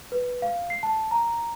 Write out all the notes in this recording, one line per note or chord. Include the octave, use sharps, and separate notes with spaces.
B4
F5
C7
A5
A#5